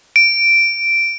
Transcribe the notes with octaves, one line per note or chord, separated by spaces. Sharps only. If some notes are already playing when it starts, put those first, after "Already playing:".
D7